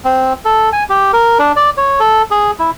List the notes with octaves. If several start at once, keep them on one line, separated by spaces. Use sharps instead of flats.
C4
A4
G#5
G4
A#4
D4
D5
C#5
A4
G#4
E4